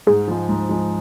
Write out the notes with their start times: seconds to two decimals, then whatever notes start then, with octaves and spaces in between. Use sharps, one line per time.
0.07 G#2 G#4
0.28 F3 G#3
0.49 G#2
0.69 F3 G#3